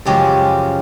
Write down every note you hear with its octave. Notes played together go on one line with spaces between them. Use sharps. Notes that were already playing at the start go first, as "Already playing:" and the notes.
F#2 C#3 F3 G#3 G4